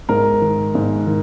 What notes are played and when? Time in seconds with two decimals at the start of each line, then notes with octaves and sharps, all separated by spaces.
0.09 G#2 A#4
0.42 D#3
0.75 G#2
1.07 D#3